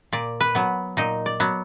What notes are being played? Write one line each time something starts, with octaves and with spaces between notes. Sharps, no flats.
A#2 D5
B4
F#3 B3
A#2 D#4
D5
F#3 B3